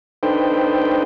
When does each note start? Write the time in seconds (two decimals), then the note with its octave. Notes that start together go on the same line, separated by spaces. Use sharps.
0.23 D4 D#4 A4 B4 C5 G5